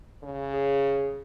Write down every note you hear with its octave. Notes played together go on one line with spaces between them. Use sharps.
C#3
G#4